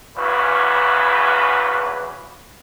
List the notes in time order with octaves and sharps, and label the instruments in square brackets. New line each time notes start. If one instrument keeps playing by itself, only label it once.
[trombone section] G#1 E2 C#3 E3 F#4 B4